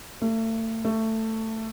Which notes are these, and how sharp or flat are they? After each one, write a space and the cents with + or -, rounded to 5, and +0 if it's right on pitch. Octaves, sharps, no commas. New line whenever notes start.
A3 +35
A3 +15